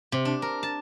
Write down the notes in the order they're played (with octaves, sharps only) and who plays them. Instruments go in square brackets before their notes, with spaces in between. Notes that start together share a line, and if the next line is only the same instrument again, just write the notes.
[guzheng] C3
D4
A#4
A5